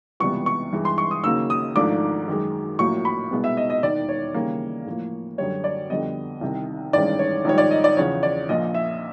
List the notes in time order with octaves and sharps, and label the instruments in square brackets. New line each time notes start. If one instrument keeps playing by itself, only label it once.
[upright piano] C#2 C3 E3 G3 B3 C#6
C#6
G2 E3 G#3
C6
C#6
D#6
D#2 C#3 F#3 A#3 E6
D#6
G#1 G#2 F3 A3 D4 D6
F#2 D#3 G#3
A#1 A2 F#3 A#3 C#6
B5
C2 B2 G#3 B3
E5
D#5
D#5
E1 D#2 D#3 D5
C#5
D#2 C#3 E3 G3 A#3
A2 F3 A#3
F#2 D3 G3 C#5
D5
F2 D3 G3 B3 D#5
C2 C3 D#3
A1 G2 D#3 G#3 C#4 D5
C#5
A#1 G#2 D#3 G3 C#5
D5
D#5
D5
E2 C#3 F3 C#5
D5
A#1 A#2 F3 D#5
E5